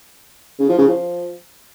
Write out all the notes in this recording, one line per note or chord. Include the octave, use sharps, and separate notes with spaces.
C#3
F3
C#3
F3